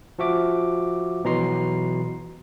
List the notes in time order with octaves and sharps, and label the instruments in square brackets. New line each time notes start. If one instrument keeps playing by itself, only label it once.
[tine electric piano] F3 F#4 E5 D6
B2 E3 F#3 A#5 C6 C7